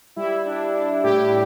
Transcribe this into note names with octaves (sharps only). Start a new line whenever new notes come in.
G3 E4
D4
D4
A2 G4